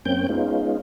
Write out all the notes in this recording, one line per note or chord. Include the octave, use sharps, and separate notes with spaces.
F#2 A#3 C4 C#4 G5 G6
G#3 B3 C#4 D#4 F4